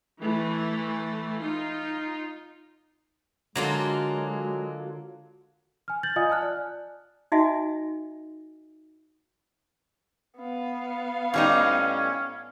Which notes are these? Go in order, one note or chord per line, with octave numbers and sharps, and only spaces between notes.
E3 A3 E4
D#4 F4
D3 F#3 G#3 A#3 F4
G#5 F6
G6 A6 F#7
F4 D5 D#5 F5 G#5 D#6
G#5 A5 F6 F#6
D5
D#4 F#4 D#5 E5 G#5
B3 F5
A2 G3 C#4 D#4